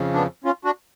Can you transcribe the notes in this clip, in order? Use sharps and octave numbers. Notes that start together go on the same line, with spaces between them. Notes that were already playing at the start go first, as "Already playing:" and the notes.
Already playing: F2 C#3
B3 D4
C#4 F4
D4 F#4